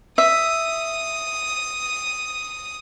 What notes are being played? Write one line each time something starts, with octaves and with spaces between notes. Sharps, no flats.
E5 D#6